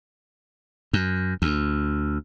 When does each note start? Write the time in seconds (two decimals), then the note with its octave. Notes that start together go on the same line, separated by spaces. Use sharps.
0.93 F#2
1.42 D2